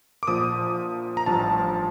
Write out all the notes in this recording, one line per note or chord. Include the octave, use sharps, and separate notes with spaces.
D6
A#1 A#2 F3 D#6
A#5
A1 G2 F3 A5